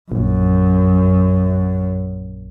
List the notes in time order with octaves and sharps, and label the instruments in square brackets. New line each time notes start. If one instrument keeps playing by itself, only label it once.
[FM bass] A#1 [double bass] F#2